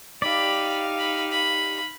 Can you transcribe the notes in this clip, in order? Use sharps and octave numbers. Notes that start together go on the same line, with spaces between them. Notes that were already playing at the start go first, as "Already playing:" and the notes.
D#4 G4 D5 F5 B5
B5
B5